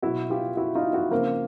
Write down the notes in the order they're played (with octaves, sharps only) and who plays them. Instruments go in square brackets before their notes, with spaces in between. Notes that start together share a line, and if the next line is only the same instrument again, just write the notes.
[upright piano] B2 F#3 E4 F#4
F4 G4
E4 F#4
D#4 F4
E4 F#4
C#3 F3 A#3 C4